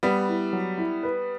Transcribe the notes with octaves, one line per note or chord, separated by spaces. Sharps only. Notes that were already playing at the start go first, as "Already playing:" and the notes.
G3 B3 B4
E4
F#3
E4
B4